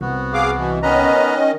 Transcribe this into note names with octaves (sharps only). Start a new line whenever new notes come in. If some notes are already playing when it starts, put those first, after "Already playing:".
C2 B3 F#4
G#4 F5 D6
B2 E3
D#3 B3 C#4 B4 D#5 A#5